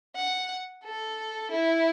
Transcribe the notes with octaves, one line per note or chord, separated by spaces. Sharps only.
F#5
A4
E4